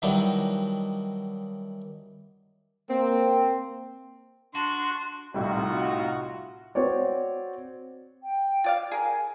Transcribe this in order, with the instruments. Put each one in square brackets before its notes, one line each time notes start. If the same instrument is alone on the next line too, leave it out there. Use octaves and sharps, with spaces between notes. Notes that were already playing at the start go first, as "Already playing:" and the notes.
[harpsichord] D#3 E3 F#3 G3 D4 D#4
[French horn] A#3 [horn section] C4
[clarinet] D4 [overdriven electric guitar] F#4 [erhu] C6
[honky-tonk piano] C2 A2 G3 [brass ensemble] D#4 F4 F#4
[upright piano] C4 F#4 C#5 D5
[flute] G5
[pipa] F4 D5 F5
[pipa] G#4 A#4 [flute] G#5